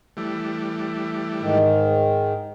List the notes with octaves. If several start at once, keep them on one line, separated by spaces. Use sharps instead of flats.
E3 G3 A3
G#2 D#3